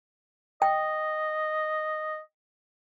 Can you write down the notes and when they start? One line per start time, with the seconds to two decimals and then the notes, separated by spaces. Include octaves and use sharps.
0.62 D#5 G5